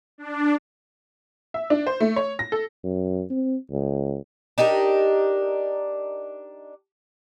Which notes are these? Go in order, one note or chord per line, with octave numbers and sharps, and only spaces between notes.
D4
E5
D4
C5
A3
C#5
A#6
A4
F#2
C4
C#2
D4 D#4 G4 A#4